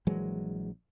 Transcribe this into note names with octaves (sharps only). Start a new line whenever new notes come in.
A#1 E3 F#3 G#3